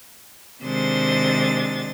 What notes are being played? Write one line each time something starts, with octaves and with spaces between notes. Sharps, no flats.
C3 D#3 G#3 D4 C5 A6